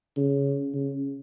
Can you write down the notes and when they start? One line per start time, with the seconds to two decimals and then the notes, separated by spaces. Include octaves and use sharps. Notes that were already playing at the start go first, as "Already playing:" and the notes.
0.17 C#3
0.74 C#3